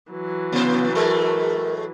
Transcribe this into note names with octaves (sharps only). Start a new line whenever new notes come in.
E3 F#3
C3 B3 C5
A2 G#3 A3 A#4